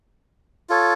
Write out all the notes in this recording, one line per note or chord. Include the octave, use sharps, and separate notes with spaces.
F4 A4 C#5